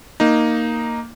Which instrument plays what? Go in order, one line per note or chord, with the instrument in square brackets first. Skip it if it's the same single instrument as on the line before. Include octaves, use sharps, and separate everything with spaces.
[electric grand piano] A#3 D#4